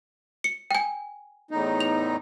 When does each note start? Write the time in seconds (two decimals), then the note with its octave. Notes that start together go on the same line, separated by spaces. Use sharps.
0.44 C#7
0.71 G5 G#5
1.51 E2 A2 D#4
1.80 F7